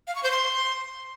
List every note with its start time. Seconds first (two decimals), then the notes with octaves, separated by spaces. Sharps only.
0.07 F5
0.15 C#6
0.23 C5
0.31 C6